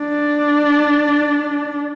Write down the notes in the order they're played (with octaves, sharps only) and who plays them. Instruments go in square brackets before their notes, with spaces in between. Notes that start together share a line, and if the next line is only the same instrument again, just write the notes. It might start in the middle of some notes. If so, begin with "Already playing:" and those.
Already playing: [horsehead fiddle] D4